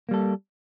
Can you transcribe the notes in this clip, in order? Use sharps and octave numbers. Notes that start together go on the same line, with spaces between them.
G3 A#3 A4